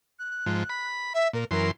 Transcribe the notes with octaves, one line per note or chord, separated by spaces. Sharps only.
F#6
G#2 F3
B5
E5
A#2 A#4
F#2 E3 A#4 C6